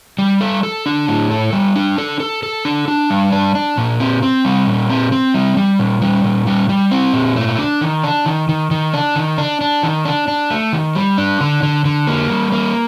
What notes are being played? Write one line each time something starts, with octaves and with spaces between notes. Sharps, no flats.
G3
A4
A4
D4
A2
A4
G3
D4
A4
A4
A4
D4
D4
G3
D4
D4
A#2
C4
C4
G3
A#2
C4
C4
G3
G3
A#2
G3
A#2
G3
G3
C4
A#2
A3
D4
D#3
D4
D#3
D#3
D#3
D4
D#3
D4
D4
D#3
D4
D4
A3
D#3
G3
D4
D3
D3
D3
A#3
G3
A#3